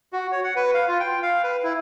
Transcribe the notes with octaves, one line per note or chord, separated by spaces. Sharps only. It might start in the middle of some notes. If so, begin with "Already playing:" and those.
F#4
C#5
F#5
B4
F5
F4
G5
F5
B4
E4